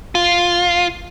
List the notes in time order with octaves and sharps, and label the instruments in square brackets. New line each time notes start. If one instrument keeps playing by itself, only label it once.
[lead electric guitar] F4